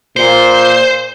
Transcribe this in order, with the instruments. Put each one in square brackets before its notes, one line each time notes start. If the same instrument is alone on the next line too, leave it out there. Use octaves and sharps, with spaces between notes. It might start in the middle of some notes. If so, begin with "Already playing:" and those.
[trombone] A#2 [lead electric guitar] C5